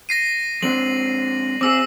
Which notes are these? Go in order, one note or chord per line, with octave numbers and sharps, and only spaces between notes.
A#6 C7 D#7
G#3 C4 D4 F#7
C4 G#4 D6 E6